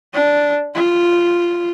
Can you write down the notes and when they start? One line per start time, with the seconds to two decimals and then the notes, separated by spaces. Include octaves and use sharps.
0.14 D4
0.74 F4